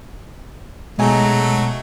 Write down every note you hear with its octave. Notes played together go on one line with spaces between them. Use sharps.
B2 F#3 G#3 A3 D#4 G#5